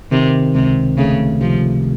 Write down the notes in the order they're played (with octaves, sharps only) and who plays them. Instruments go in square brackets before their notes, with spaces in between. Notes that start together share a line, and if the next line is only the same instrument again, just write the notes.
[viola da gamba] C3 [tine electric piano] D#3
[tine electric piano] C#2 [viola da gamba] C3
[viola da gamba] C#3 [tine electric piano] A3
[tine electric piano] C3 [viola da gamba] F3